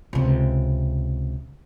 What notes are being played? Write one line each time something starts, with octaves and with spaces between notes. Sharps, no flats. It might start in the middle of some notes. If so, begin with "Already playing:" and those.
C#2 C3